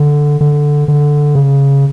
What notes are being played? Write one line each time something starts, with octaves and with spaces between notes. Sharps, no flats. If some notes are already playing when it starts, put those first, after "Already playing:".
Already playing: D3
D3
D3
C#3